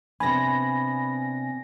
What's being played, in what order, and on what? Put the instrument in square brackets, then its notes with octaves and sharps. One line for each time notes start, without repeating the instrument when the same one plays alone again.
[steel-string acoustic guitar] C3 B3 D4 [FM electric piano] G#5 A#6 [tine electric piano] B5